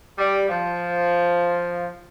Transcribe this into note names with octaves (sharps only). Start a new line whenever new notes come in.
G3
F3